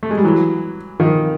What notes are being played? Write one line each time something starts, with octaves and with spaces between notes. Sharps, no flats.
A3
G#3
G3
E3 F#3
D#3 F3